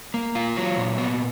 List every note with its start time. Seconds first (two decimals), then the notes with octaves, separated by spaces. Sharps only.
0.14 A#3
0.35 F4
0.56 F#3
0.77 A#2
0.98 B3